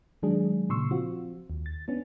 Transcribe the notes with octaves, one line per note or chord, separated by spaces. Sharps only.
D#3 F#3 G#3 D4 G#4
A#2 C#3 C6 C#6 E6
F3 C4 F4 F#4
D#2
A6
B3 C#4 D4